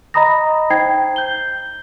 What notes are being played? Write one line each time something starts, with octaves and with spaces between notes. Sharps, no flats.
D#5 A#5 B5 D#6 A#6
D#4 C5 G5 G#6 C7
G6 G7